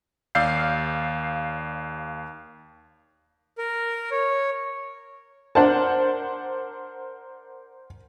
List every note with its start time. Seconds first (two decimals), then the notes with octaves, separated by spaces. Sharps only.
0.35 D#2 D5 F5 E6 G6 C7
3.58 A#4
4.11 C#5
5.55 D4 A#4 C5 F#5 A5